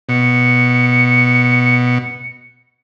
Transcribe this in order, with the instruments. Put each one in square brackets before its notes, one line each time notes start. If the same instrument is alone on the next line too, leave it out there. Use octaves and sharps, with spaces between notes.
[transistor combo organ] B2 [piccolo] C#7